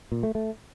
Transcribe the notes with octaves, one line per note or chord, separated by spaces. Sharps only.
A#2
A3
A3